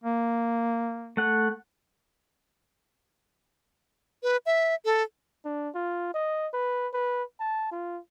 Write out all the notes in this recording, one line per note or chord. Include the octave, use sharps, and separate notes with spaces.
A#3
A3 F#5
B4
E5
A4
D4
F4
D#5
B4
B4
A5
F4